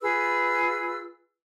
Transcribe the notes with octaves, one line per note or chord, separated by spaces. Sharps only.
F4 G#4 B4 E6